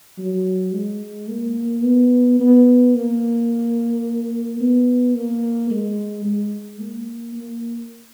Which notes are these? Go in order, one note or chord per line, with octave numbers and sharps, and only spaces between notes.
F#3
G#3
A#3
B3
B3
A#3
B3
A#3
G#3
G#3
A#3
A#3